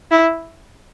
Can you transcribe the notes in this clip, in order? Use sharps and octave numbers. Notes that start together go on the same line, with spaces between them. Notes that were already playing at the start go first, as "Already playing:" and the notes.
E4